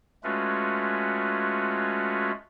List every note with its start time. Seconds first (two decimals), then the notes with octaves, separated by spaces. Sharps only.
0.24 G#3 A3 C#4 F4 F#4 B4